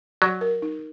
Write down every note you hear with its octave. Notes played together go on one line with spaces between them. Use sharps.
F#3 D5
A#4
D#4